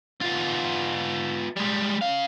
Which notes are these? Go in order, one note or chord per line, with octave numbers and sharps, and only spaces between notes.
B3 F4
G3 G#3
C#3 F5